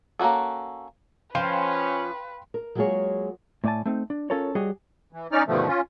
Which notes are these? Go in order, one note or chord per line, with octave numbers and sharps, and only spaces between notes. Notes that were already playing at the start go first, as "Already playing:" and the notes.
A#3 C#4 D#4 F#4 A4
F3 C#4 B4 F5 G5 C6
A#4
F#3 G#3 A#3 F4 G#4 C#5
A2 A3 D5 E5 G#5 A5
A3 C4 D#4
D4
C#4 F4 A4 A#4 C#5
G3 F#4 G#4 C#5 D#5
E3
C#4 D#4 D5 F6
G2 B2 D3 D#3 F3 A3
C#4 F4